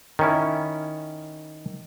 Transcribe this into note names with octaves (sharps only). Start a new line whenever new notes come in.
D#3 C#4 E4